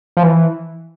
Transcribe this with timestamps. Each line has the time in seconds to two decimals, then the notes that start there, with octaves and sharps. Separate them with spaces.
0.17 F3
0.23 E3